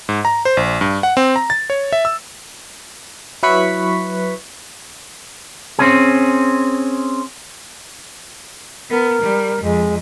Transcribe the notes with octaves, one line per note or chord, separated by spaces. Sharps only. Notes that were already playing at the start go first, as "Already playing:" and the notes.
G#2
A#5
C5
A#1
G2
F#5
C4
A#5
A6
C#5
E5
E6
F#3 E4 B4 C#6 F#6 B6
C4 C#4 G#4
B3 A#4
G3
F2 G#3